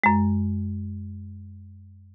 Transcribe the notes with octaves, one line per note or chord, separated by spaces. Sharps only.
F#2 G#3